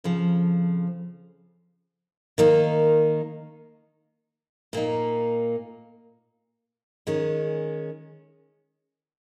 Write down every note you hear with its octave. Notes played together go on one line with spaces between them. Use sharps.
F2 C#3 F3
D#3 A#3 D#4
A#2 A#3 D#4
D#3 G#3 C#4